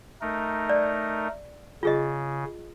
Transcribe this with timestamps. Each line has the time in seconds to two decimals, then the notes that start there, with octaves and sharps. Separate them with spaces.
0.21 A3 D#4 A#4
0.69 D5
1.83 C#3 F4 G#4 D#5